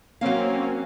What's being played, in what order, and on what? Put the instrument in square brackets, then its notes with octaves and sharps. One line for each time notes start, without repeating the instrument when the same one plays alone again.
[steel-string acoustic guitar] F#3 F5 [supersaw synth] A#3 C4 C#4